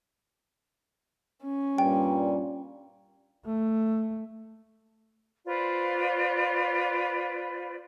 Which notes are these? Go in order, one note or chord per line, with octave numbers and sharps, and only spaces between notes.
C#4
G2 A#2 G3 G5
A3
F4 B4 C5 D5